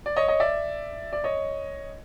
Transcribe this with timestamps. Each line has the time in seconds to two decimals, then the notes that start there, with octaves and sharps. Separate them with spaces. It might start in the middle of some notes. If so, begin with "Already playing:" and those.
0.06 D5
0.16 C#5 D#5
0.28 C#5 D#5
0.40 D5 E5
1.13 D5
1.24 C#5 D#5